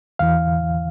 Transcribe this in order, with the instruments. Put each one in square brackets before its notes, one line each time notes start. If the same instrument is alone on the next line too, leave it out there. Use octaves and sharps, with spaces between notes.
[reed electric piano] E2 E3 F5